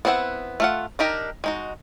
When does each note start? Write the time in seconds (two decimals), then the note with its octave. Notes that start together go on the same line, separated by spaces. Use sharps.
0.05 B3 C4 D4 E4 F#5
0.60 A3 F4 F#5
0.99 D4 D#4 G4 A#4
1.44 G#3 D#4 F#4